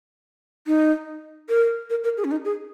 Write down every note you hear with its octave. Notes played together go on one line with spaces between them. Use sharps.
D#4
A#4
A#4
A#4
G#4
C#4
D#4
G#4